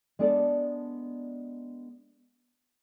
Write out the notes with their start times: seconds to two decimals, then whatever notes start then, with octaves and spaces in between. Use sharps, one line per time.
0.19 G#3 B3 D4 A4 D5